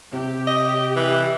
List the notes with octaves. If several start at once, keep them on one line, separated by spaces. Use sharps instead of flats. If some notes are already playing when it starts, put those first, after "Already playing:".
C3 G4
D#5
E3